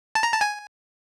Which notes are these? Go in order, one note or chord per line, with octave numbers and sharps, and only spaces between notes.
A5
A#5
A5
G#5